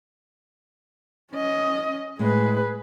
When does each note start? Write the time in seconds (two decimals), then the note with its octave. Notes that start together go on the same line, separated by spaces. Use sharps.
1.32 C#4 D#5
2.19 A2 G#3 G#4 B4